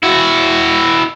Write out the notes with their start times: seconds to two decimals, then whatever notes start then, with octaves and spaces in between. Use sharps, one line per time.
0.03 E4 F#4